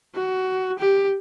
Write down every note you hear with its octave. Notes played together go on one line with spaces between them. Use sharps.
F#4
G4